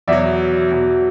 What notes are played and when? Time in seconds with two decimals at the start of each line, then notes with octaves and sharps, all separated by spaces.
0.07 E2 B2 F#3 D5 E5
0.71 E2 B2 F#3